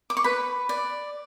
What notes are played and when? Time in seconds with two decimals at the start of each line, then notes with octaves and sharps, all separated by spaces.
0.10 D6
0.17 C#6
0.24 B4 B5
0.69 D5